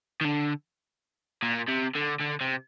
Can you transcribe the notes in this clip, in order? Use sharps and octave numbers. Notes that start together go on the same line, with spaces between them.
D#3
D3
A#2
C3
D3
D3
C3